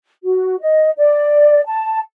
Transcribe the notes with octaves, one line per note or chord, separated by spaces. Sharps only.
F#4
D#5
D5
A5